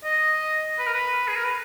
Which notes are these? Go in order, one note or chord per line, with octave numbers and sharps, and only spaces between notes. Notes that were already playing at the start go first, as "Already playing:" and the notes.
D#5
B4
A#4
B4
G#4
A#4
B4